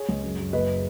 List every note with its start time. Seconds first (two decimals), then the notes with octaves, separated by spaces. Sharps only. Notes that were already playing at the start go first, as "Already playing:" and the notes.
Already playing: G#4 C#5
0.09 C#2
0.24 F#2
0.39 F#2
0.53 F#1 B4 D#5